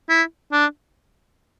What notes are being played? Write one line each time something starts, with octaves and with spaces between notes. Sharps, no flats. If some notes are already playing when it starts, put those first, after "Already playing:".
E4
D4